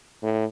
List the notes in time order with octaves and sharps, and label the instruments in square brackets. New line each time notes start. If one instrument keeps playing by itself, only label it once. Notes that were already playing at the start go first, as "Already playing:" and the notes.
[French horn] A2